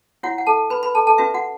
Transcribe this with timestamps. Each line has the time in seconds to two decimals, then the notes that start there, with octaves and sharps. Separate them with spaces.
0.23 E4 F#4 C#5 F#5
0.38 F#5
0.47 A4 A5
0.70 B4 B5
0.83 B4 B5
0.95 A4 A5
1.07 A4 A5
1.18 C#4 F#4 B4 E5
1.34 F#4 F#5